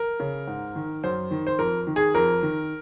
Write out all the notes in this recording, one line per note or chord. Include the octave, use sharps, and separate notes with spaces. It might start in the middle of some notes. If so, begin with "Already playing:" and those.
Already playing: A#4
C#3
G#2
D#3
F#2 C5
D#3
C5
F2 A#4
D#3
G#4
F2 A#4
D#3